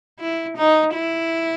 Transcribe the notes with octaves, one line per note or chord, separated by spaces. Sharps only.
E4
D#4
E4